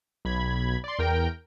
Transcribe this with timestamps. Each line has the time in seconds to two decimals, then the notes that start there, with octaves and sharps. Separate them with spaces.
0.25 B1 B5 G#6
0.84 D5 C6
0.99 E2 A#4 G5 D7